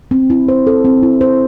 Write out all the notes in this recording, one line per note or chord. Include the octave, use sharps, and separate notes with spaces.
C4
E4
C5
A4
C4
E4
C5